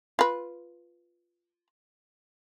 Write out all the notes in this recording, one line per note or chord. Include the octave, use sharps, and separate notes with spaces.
F4 B4